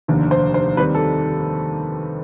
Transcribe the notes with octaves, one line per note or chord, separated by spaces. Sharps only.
F1 D#2 D3
C5
C5
D#2 D#3 G3 C4 B4
A4